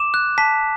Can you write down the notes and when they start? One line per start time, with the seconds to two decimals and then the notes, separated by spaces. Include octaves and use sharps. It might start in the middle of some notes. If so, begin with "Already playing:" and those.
Already playing: D6 E7
0.14 F#6
0.38 A5 B6